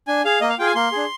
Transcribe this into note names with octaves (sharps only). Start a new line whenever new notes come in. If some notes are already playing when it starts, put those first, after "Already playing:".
D4 G#5
G#4 F5
A#3 D#5
F5
F4 G#4 G5
G#5
A#3 C6
D4 G#4